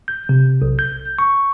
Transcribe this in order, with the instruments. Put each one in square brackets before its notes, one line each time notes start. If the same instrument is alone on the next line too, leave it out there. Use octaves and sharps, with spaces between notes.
[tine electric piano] G6
C3
B1
G6
C#6